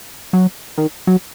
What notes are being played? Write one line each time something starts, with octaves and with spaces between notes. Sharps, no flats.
F#3
D#3
F#3